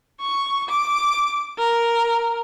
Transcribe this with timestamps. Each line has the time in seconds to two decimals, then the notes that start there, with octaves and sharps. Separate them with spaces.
0.21 C#6
0.69 D6
1.58 A#4